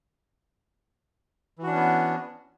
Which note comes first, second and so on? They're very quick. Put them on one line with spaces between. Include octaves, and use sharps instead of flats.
E3 F#4 D4 C#4 B3